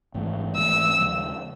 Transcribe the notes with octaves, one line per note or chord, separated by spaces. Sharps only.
G#1 G#2 E3 A3
G#1 G#2 E3 A3 E6
D#2 C#3 F3 G#3